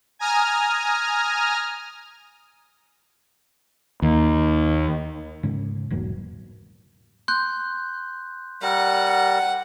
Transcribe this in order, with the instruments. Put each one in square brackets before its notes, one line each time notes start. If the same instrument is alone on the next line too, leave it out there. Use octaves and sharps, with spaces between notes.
[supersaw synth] G#5 A#5 D#6 F6
[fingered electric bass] D#2
G#2 C#3
E1 G#2 F#3 A#3
[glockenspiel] C6 F#6 G6
[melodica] G3 A#4 [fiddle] F#5